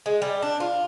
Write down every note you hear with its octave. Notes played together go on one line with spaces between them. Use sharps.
G#3
G3
D4
F4